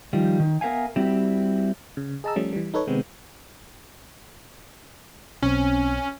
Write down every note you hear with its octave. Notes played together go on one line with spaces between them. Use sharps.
D#3 F3 G3
D#3
B3 A#4 E5 F5 G#5
G3 C4 E4 F#4 G4
C#3
G#4 D#5 A5 A#5 E6
F3 G3 A3 C#4
E3 G3
D#4 A4 B4 C#5
C3 D#3 G#3 B3 C4
B1 C4 C#4